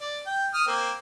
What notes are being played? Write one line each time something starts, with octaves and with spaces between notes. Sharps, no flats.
D5
G5
D#6 F6
A#3 C4